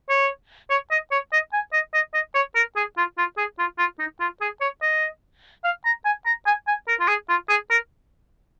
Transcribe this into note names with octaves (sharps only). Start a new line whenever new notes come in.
C#5
C#5
D#5
C#5
D#5
G#5
D#5
D#5
D#5
C#5
A#4
G#4
F4
F4
G#4
F4
F4
D#4
F4
G#4
C#5
D#5
F5
A#5
G#5
A#5
G#5
G#5
A#4
F4
G#4
F4
G#4
A#4